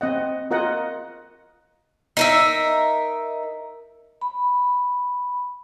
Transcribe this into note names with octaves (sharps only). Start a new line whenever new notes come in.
C4 D#5 F#5
F4 A#4 D#5 F#5
D#4 A#4 E5
B5